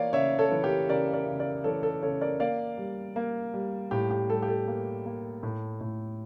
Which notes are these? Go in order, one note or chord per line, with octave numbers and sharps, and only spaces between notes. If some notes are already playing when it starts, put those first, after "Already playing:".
Already playing: E3 A#3 C#5 D5 F5
C#3 C#5 E5
A4 C#5
E3
G4 A#4
C#3 A#4 D5
A#4 D5
C#3
A#4 D5
E3 A4 C#5
A4
C#3 A4 C#5
A#4 D5
A#3 D5 F5
G3
A#3
G3
A2 G4
G4
G3 A4
G4
A4
A#3
A#3
A2
A2